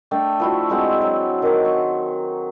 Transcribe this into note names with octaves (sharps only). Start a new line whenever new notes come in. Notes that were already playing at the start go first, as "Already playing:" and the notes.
A3 D4 G5
F3 E4 F#4
G#3 C4 F#5
F#3
D#3 D6
C#6